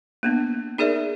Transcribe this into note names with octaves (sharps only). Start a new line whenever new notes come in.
A#3 B3 D4
D#4 G#4 A#4 D5 E5